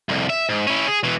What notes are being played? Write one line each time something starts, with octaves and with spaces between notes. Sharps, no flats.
C2 F2
E5
G#2
C#4 E4
G#4
B2 E3